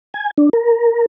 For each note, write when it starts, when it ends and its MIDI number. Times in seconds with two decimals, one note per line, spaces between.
0.14 0.31 80
0.38 0.49 62
0.53 1.06 70